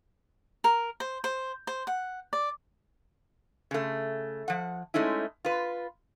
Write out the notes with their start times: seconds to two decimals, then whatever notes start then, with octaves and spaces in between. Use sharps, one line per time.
0.64 A#4
1.00 C5
1.24 C5
1.67 C5
1.87 F#5
2.33 D5
3.71 C#3 A3
4.48 F3 F#5
4.94 G#3 A3 C#4 D#4 E4
5.45 F4 B4